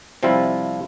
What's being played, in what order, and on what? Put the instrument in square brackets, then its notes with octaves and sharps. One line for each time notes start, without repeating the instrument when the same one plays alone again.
[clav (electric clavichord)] C3 F3 G3 C4 E4 F4